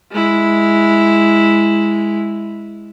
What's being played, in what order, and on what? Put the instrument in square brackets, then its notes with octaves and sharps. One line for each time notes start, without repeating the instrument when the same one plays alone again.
[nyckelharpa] G#3 E4